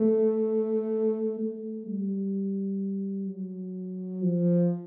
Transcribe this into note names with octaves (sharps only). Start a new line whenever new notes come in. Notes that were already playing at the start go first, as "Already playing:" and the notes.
Already playing: A3
A3
G3
F#3
F3